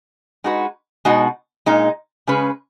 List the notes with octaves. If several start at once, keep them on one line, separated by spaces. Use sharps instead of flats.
G#3 D#4 F#4 B4
B2 G#3 D#4 F#4
A#2 G#3 D#4
C#3 G#3 C#4 G#4 B4